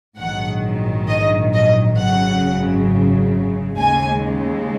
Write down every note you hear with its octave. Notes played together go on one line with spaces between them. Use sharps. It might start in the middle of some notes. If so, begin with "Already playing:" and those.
A#1 G#2 D#3 F#3 F#5
D#5
D#5
G#1 F#2 C#3 F#3 F#5
D#2 C#3 G#3 G#5